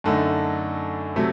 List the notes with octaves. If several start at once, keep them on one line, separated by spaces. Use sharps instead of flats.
F#2 D3 A3 D#4
C3 F#3 A3